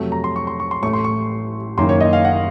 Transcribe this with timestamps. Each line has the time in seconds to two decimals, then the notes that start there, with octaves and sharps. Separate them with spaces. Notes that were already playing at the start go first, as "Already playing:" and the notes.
Already playing: F2 C3 F#3 A3
0.12 A#5
0.24 C6
0.36 C#6
0.47 C6
0.60 C#6
0.71 C6
0.83 A1 A2 A3 C#6
0.93 C6
1.04 C#6
1.77 F#1 F#2 D#3 A#3 C6
1.89 C#5
2.01 D#5
2.13 F5
2.25 F#5